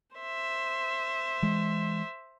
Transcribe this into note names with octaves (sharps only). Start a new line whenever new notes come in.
C5 E5
E3 G#3